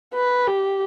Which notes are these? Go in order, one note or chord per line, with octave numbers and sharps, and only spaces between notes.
B4
G4